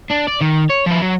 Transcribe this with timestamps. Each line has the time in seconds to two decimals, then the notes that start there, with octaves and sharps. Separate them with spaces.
0.10 D4
0.27 D5
0.41 D#3
0.69 C#5
0.86 F3 E4
1.02 F#3